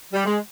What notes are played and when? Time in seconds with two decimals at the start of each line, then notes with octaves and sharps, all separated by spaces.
0.13 G3
0.25 G#3